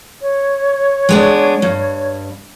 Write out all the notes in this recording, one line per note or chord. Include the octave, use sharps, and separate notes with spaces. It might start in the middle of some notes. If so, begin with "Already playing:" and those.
C#5
G#3 B3 D4
G2